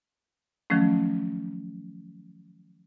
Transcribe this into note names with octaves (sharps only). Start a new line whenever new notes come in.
D#3 F3 F#3 A3 C#4